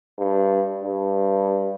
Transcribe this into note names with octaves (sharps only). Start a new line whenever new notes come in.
G2
G2